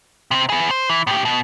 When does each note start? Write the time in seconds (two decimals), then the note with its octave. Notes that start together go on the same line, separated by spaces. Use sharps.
0.31 C3 C4
0.50 B3 G#4
0.71 C5
0.90 E3
1.07 A2 G4
1.25 B2